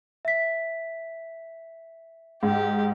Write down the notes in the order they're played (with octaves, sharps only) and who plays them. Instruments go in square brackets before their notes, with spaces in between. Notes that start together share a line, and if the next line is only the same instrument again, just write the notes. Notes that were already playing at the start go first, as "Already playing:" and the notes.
[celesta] E5 B6
[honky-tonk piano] G#2 [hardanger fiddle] G4